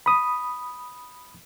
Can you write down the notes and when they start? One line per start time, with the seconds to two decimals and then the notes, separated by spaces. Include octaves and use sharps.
0.06 B5 D#6